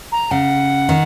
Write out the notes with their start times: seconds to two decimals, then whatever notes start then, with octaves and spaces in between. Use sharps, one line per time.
0.12 A#5
0.31 C#3 F#5
0.89 D#3